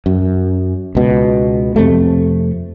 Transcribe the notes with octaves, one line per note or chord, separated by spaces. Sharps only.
F#2
C#2 B2
F2 C3 A3